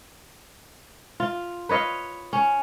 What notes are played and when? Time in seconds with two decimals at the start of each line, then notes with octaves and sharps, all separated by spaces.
1.20 F4
1.69 B4 C#5 D#5 F5
2.33 C#4